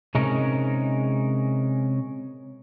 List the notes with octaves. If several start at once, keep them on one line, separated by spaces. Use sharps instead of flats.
C3 G#3 C#4 D#4 A#4